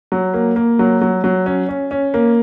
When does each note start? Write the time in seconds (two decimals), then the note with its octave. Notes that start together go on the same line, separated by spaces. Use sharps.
0.12 F#3
0.34 A#3
0.56 A#3
0.79 F#3
1.01 F#3
1.24 F#3
1.46 C#4
1.69 C#4
1.91 C#4
2.14 A#3